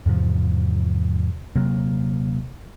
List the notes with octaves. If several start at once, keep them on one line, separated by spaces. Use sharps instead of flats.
E2 G#2 C3 F3
D#1 C3 F#3 A#3